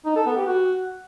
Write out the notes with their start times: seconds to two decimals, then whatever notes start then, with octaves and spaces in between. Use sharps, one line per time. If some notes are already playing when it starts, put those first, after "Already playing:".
0.06 D#4
0.16 A4
0.26 B3
0.37 G4
0.47 F#4